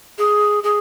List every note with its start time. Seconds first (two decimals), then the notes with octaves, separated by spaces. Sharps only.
0.18 G#4
0.63 G#4